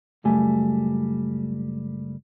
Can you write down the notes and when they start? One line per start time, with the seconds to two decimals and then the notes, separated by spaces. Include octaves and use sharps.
0.24 C#2 F#2 G3 A3 G#5